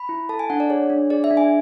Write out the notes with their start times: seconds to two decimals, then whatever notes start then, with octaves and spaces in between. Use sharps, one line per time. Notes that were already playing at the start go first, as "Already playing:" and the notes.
Already playing: B5
0.09 E4
0.29 A4 A5
0.39 G#5
0.50 D4 F#5
0.60 D5
0.70 G#4 C#5
0.90 D4
1.10 G#4 D5
1.24 E5
1.31 D4
1.37 G#5